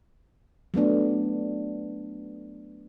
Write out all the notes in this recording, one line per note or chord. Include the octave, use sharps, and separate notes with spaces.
F#3 A3 B3 D4